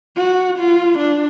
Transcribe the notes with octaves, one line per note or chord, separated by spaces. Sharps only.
F#4
F4
D4